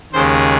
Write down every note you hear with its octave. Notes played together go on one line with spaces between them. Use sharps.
D#2 C#3 G#3 C5